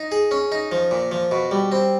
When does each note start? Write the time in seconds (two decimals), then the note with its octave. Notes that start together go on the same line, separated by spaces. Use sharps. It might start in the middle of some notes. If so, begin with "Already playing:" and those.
Already playing: D#4
0.12 G#4
0.31 C#4
0.52 D#4
0.72 F3
0.91 A#2
1.12 F3
1.31 B2
1.51 G3
1.72 C4